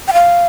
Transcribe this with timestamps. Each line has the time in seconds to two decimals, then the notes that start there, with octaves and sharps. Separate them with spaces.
0.08 G5
0.13 F5